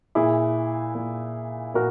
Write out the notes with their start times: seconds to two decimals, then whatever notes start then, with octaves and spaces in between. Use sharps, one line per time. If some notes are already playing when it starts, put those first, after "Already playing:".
0.15 A#2 E4 G#4
0.95 A#2
1.74 A#2 F#4 A#4